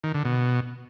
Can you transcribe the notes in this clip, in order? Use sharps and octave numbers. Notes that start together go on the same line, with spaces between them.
D#3
D3
B2